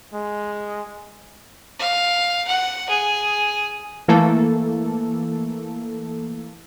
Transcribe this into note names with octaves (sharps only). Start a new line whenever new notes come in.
G#3
F5
F#5
G#4
E3 A3 A#3 A4